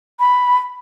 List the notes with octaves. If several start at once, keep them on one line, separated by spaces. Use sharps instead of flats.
B5